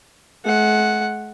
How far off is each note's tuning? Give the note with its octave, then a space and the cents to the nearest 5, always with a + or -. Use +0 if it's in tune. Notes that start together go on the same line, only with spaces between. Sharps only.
G#3 +45 F#5 +0